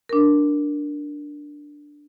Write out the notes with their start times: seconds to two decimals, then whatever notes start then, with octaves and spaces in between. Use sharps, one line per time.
0.09 D4 A#4